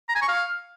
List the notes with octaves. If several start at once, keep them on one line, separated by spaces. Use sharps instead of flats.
A#5
G#5
C#6
F5